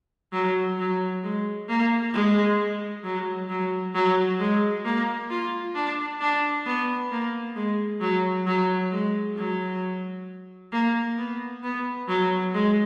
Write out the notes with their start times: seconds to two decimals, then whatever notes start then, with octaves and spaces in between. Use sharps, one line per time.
0.33 F#3
0.79 F#3
1.23 G#3
1.69 A#3
2.13 G#3
3.04 F#3
3.49 F#3
3.95 F#3
4.40 G#3
4.85 A#3
5.30 F4
5.75 D4
6.21 D4
6.66 B3
7.11 A#3
7.56 G#3
8.01 F#3
8.47 F#3
8.92 G#3
9.37 F#3
10.73 A#3
11.18 B3
11.63 B3
12.08 F#3
12.54 G#3